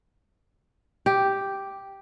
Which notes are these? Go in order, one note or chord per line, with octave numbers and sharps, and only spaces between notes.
G4